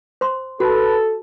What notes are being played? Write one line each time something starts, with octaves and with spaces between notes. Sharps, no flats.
C5 C6
F#4 A4 B4